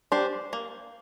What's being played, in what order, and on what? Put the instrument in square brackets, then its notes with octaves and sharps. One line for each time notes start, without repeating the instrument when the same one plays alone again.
[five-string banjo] D4 G4 C5
A#3